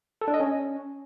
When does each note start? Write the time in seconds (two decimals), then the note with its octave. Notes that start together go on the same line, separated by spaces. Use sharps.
0.21 A4
0.28 D4
0.34 D#5
0.40 C#4